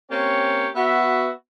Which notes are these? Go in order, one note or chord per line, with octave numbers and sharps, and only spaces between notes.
A#3 C4 C#4 G4 C#5
B3 F#4 E5